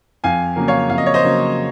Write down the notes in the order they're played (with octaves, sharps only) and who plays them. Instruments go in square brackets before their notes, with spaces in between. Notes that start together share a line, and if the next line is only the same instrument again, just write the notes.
[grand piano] F2 F5 G#5
C#3 F#3 A#3
C#5 F5
F2 F5
D#5
C#5
C5 D#5
C#3 F#3 A#3